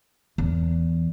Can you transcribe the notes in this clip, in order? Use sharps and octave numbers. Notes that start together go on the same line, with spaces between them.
E2